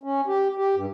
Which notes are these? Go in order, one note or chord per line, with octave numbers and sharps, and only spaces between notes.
C#4
G4
G4
G2